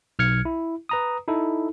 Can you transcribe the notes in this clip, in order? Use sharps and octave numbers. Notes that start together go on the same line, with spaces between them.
B1 F6 G#6 C#7
E4
B4 A#5 D#6
D#4 E4 A4